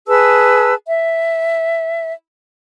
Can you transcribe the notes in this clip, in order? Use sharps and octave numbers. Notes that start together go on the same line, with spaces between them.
G#4 B4 A5 E6
E5